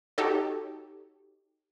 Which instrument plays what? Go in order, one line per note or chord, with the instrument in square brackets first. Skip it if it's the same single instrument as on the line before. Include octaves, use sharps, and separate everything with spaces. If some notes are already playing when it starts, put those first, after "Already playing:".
[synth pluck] D#4 F#4 G4 A4 C#5